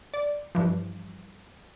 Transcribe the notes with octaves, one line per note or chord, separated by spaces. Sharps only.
D5
G2 E3 F3